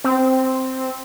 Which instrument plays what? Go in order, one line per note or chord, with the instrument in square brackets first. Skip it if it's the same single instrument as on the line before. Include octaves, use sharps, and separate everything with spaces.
[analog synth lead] C4